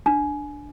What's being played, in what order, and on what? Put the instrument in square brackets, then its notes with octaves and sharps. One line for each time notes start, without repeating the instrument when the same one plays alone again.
[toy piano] D4